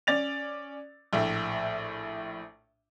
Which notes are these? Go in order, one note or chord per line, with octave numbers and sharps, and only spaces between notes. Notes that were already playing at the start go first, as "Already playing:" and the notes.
C#4 D5 A6 F7
A#1 A2 E5